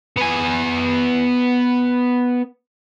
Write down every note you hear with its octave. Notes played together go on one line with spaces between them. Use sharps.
B3 G#5